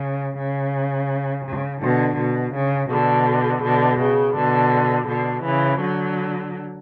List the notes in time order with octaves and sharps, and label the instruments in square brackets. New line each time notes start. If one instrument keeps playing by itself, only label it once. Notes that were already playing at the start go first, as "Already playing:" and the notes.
Already playing: [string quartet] C#3
C#3
C#3
B2 D3
B2
C#3
B2 D3
B2 D3
C#3
B2 D3
B2 D3
C#3 E3
D3 F#3